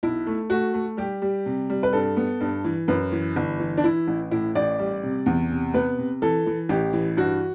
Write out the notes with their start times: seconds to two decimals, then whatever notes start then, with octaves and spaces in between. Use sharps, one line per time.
0.03 B1 E4
0.27 A3
0.50 A3 F#4
0.74 A3
0.97 G3 G4
1.22 G3
1.46 C3
1.70 G3
1.83 B4
1.93 G2 A4
2.17 B3
2.40 G2
2.64 E3
2.88 F#2 B4
3.12 E3
3.36 G1
3.60 E3
3.78 D4
3.84 E3 E4
4.07 A1
4.31 A2 E4
4.55 A1 D5
4.79 G3
5.03 C3
5.26 E2
5.51 C3
5.74 B3 B4
5.98 C3
6.22 E3 A4
6.46 E3
6.69 A1 G4
6.93 E3
7.17 G2 F#4